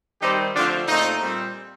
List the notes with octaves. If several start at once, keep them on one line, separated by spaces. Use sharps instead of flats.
D#3 G3 C4 D#4 G4
D3 F3 A3 C4 D4 F4
A#2 A3 C4 D#4
A#2 G3 C4